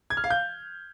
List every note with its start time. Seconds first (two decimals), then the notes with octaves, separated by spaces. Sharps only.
0.10 G#6
0.17 F6
0.24 F5
0.30 G6